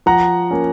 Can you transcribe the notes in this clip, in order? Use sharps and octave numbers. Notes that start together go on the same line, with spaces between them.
F3 F#5 A#5
A#3 C#4